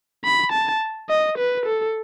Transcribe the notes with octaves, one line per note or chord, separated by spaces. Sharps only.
B5
A5
D#5
B4
A4